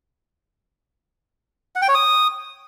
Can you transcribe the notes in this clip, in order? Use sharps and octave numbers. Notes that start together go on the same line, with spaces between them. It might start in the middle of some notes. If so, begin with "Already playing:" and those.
F#5
G5
C#5
D#6